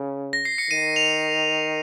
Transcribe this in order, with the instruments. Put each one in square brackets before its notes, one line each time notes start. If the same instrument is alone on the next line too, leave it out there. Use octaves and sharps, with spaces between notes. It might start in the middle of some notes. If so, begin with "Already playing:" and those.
Already playing: [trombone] C#3
[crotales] A#6
C7
C#7
[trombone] D#3 [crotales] D#7
[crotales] F7